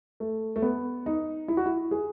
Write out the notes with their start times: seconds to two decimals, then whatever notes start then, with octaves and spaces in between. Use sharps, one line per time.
0.20 A3
0.56 A3
0.62 B3
1.06 D#4
1.48 E4
1.57 F#4
1.66 E4
1.91 G#4